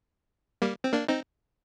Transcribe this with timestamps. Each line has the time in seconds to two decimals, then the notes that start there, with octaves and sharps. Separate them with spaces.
0.62 G3 A#3
0.84 C4
0.93 A#3 D4
1.08 C4 D#4